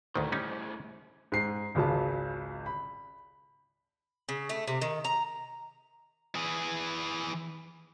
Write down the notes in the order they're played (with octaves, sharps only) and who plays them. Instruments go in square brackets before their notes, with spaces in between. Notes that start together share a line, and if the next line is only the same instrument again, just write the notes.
[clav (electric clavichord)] D2 D#3 [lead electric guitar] A2 C5
[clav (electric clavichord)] G3 C#4 D#4
[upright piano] G#2 C7
G#1 C#2 C#3 F#3 A5
B5
[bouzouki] C#3
A3
C3
D#3
A#5
[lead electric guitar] E3 G#4